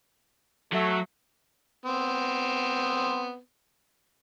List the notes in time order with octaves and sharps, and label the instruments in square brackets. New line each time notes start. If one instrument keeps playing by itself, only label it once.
[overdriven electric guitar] F#3 [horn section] A3
[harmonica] B3 C4